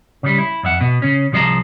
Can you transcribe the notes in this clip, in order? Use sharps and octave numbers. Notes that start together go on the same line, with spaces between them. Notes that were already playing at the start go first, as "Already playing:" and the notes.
C#3 G3
E4
F2 E5 F#5
B2
C#3 C#4
C2 F3 G#4 D#5 A5 A#5